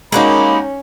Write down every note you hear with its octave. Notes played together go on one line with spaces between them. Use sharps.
G#3 A#3 C#4 D#4 F#4 G4 B5